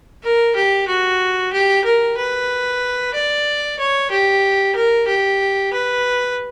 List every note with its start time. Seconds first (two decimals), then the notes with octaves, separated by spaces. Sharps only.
0.24 A#4
0.56 G4
0.88 F#4
1.53 G4
1.85 A#4
2.17 B4
3.14 D5
3.79 C#5
4.11 G4
4.75 A#4
5.08 G4
5.73 B4